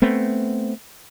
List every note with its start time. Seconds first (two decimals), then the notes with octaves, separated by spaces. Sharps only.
0.02 A3 B3 C4